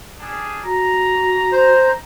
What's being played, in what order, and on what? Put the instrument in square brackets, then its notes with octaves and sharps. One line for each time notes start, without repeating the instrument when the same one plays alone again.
[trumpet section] G3 D4 G#4
[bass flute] F#4 [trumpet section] A#5
[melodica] C5